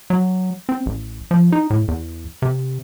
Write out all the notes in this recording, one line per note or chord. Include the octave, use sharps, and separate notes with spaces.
F#3
C4
A1
F3
D#4
A2
E2
C3